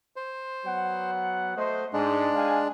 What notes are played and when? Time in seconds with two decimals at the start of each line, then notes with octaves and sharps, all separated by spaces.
0.16 C5
0.65 F#3 B3 F#5
1.57 A3 C5 D#5
1.93 G#2 G#3 D4
2.36 F5 G5 G#5